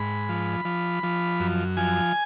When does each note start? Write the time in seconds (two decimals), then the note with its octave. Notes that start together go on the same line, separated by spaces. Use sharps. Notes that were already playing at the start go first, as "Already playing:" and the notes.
Already playing: G#2 B5
0.29 F3
0.65 F3
1.03 F3
1.40 F#2
1.77 F3 G#5